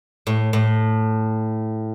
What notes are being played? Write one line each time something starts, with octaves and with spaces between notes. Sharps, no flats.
A2
A2